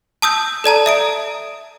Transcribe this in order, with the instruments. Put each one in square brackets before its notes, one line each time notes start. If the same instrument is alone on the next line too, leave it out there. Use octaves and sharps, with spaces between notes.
[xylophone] A5 D#6 E6 G6
A4 D5 A5 A#5
E5 D#6 D7